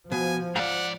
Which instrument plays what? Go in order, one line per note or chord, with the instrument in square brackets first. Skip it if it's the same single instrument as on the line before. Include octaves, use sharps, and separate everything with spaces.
[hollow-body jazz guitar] B2 [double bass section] F3 [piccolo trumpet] G#5
[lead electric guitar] G#2 D5 [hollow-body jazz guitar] F5 [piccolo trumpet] F#5